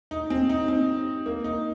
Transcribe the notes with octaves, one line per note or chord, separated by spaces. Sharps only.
D#4
C4
D#4
C4
A#3
D#4